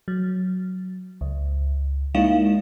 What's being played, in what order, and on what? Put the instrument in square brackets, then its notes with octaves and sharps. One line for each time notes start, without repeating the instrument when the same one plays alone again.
[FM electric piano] F#3
C#2
[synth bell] G#3 F5 E7 [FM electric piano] A#3 D#4 E4